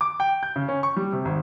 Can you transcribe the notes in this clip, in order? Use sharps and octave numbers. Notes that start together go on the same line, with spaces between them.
D6
G5
G6
C#3
C#4
C#6
G3
C3
G#1